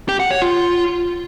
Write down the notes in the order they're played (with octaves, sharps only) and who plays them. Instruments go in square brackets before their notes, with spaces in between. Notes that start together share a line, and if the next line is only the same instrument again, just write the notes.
[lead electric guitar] G4
F#5
C#5
F4